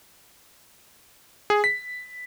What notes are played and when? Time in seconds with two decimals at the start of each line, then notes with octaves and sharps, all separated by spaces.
1.50 G#4
1.64 B6